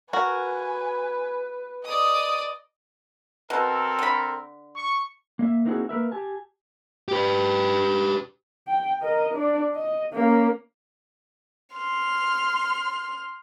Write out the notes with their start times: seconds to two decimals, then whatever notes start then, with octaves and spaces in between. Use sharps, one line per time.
0.13 F#4 A#4 B4 G#5
1.85 D5 D#5 D#6
3.50 B2 C4 A4 A#4
3.99 D3 B5
4.75 C#6
5.39 A#3 D#5 E5
5.65 A#3 C4 D#4 E4 F#4 G#4
5.89 A#3 A#4 B4 E5
6.12 G4 G#5 A5
7.08 G4 B4
8.68 G5
9.02 A#4 D#5
9.35 D4 D5
9.75 D#5
10.14 A#3 C#4
11.75 C6 F6